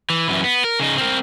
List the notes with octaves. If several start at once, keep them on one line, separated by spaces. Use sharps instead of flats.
E3
F#2 E3
B3
A#4
C#3 D#4
C4 A#4